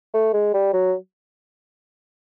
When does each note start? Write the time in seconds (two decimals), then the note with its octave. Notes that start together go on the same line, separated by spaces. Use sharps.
0.14 A3
0.33 G#3
0.54 G3
0.73 F#3